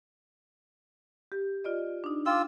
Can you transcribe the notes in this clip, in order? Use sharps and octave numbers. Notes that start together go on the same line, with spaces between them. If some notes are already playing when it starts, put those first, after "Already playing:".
G4
F4 D5 D#5
D4 D#4
F4 G5 D6 E6